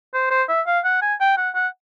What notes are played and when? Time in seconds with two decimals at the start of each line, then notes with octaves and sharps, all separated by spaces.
0.14 C5
0.31 C5
0.49 E5
0.67 F5
0.85 F#5
1.02 G#5
1.20 G5
1.37 F#5
1.55 F#5